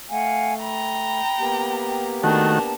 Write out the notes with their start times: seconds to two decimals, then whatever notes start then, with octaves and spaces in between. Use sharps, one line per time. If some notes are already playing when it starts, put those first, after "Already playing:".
0.10 A3 F5 F#5 G#5
0.59 G5 A#5 B5
1.39 A#3 B3 G4
2.23 D#3 A3 D4 F#4 A#4 A5